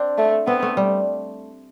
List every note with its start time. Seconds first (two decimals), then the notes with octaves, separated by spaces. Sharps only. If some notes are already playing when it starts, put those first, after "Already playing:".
Already playing: C4 D4
0.18 A3
0.47 B3 C4
0.63 A3
0.77 G3